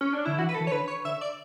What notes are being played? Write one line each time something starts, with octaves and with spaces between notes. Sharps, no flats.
C#4
D4
D3 E4
E3 F#4
B4
A4
E3
C#5
D3 B4
C#5
D3 E5
D5